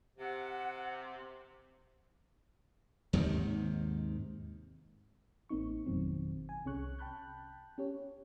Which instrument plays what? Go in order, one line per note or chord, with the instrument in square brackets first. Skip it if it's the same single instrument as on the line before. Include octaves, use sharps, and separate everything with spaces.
[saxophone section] C3 [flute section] F#5
[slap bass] D#2 G#2 C3 D#3
[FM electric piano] A1 A#3 C4 D#4 C#6
G#1 F2 B2 D#3 F#3 C4
G#5
C2 C3 C#4 G#4 C#6 F#6
G5 A5 B5 F#6 G6
C#4 G4 C#5